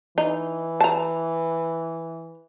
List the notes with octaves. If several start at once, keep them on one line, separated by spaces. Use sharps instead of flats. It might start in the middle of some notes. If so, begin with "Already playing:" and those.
E3 D#4
A5 A#5